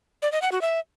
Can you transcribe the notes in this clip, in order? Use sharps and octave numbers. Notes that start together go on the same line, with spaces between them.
D5
D#5
F#5
F#4
E5